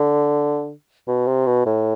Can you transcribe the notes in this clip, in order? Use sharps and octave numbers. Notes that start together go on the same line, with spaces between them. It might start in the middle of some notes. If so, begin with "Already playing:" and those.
Already playing: D3
B2
C3
B2
A2